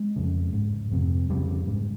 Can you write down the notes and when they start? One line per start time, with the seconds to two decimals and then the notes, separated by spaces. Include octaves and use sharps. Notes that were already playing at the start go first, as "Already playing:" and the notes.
Already playing: G#3
0.16 F2 C#3
0.53 G#2
0.92 F2 C3
1.30 F2 C#3 G3
1.67 G#2